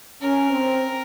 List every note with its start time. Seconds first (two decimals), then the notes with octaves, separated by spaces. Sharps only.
0.22 C#4 A#4
0.50 C4